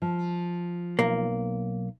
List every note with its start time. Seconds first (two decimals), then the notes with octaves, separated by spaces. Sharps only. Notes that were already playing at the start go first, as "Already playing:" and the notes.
0.02 F3
0.99 B1 A#3